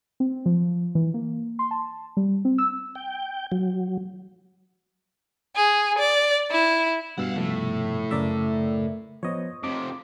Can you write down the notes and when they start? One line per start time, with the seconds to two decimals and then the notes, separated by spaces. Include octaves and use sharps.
0.20 C4
0.46 F3
0.95 E3
1.14 A#3
1.59 C6
1.71 A5
2.17 G3
2.45 C4
2.58 E6
2.95 G5
3.52 F#3
5.56 G#4
5.99 D5
6.51 E4
7.18 G2 B2 F5 F#5 E6
7.36 A2 C3 F3
8.11 F#2 C#3 A3 A#4 D5 E5
9.23 F3 B3 C5 C#5 D#5
9.64 F2 C3 D6